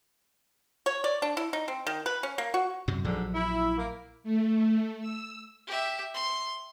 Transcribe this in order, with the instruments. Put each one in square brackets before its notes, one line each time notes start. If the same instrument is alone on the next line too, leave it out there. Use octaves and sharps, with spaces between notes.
[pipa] C#5
D5
D4
E4
D#4
C4
D#3
B4
C#4
A#3
F#4
[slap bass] F#2 C3 F#3
[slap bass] A#1 F3 F#3 [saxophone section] G#2 D3
[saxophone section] E4
A#3
[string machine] A3
E6
[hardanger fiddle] G4 E5
C6